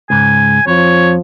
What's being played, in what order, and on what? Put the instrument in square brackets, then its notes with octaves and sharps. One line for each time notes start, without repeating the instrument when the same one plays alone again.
[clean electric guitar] C#2 G#2 [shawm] G#5
[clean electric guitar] F2 [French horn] F3 [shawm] C#5